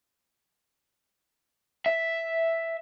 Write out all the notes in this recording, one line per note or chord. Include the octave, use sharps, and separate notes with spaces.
E5